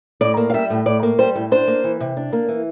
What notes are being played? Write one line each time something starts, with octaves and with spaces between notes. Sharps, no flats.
A2 D5
A#3
F5
G3 E5
A2
A2 D5
A#3
G3 C5
A2
D4 C5
A#3
E3
C3
D4
A#3
E3